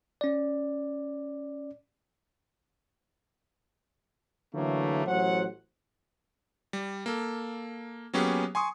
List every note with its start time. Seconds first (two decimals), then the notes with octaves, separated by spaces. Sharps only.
0.21 C#4 D5
4.54 D3 E3 F#3 A3 A#3
5.06 A1 F#3 C5 F#5
6.73 G3
7.06 A#3 A4
8.13 F#3 A#3 B3 C#4 G4 G#4
8.55 G#5 C6 C#6 D#6